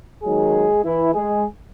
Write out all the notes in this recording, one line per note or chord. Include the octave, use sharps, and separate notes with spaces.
D#2 D#3 F#3 G#3 G#4
E3 E4
G#3 G#4